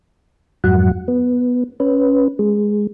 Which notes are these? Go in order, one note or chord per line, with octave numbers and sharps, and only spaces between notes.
F2 G#2 F#3 F#5
B3
C#4 B4
G#3